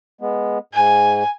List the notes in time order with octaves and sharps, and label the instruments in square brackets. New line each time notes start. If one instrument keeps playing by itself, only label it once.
[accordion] G#3 B3
[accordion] G#2 [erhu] G#5